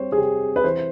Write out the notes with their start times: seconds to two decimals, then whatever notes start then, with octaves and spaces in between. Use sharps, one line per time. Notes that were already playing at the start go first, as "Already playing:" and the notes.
Already playing: G3 C4 C5 C#5
0.12 G#4
0.17 C3 G4
0.56 B4
0.64 E3 C5